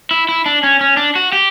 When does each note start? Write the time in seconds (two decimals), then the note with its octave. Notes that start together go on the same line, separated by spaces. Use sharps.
0.11 E4
0.29 E4
0.46 D4
0.63 C#4
0.81 C#4
0.97 D4
1.16 F#4
1.32 G4